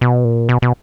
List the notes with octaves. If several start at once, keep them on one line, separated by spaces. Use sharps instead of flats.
B2
A#2
B2
B2